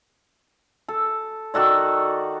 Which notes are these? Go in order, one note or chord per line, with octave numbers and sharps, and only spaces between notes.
A4
D#3 F#4 A4 D5